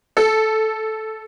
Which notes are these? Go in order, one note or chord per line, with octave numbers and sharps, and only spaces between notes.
A4